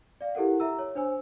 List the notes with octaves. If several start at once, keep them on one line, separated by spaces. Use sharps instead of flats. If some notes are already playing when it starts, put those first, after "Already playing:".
D5 F5
E4 G4 A4 A#4 F#5
E5 A#5 E6
C#5
D4 C5 G#5 E6